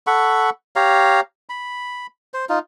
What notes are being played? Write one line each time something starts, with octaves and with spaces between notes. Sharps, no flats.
A4 F#5 B5 C#6
G4 C#5 F5 A#5
B5
C5
D#4 F4